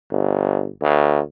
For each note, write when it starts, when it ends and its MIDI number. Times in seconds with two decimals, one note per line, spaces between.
0.11 0.69 31
0.82 1.20 38